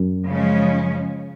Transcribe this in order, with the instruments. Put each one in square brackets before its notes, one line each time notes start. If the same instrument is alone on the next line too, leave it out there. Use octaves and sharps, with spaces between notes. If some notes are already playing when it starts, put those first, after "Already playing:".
Already playing: [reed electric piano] F#2
[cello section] C#3 F3 G#3 C#4